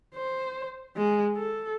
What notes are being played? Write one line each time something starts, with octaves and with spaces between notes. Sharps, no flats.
C5
G#3
A4